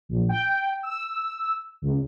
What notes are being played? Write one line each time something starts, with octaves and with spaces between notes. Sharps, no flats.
A#1
G5
E6
C#2